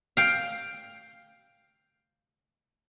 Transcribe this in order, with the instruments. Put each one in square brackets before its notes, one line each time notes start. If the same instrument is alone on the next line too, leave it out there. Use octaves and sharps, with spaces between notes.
[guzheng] F5 G5